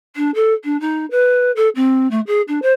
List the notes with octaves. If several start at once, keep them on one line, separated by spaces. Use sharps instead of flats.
D4
A4
D4
D#4
B4
A4
C4
A3
G#4
D4
C5